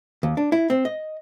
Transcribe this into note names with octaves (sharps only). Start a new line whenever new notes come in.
D#2
D4
E4
C4
D#5